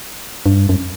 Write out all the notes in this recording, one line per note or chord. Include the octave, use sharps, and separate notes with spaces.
G2
F#2